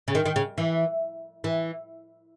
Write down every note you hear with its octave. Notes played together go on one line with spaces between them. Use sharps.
C#3
D#3
D#3
C#3
E3
E3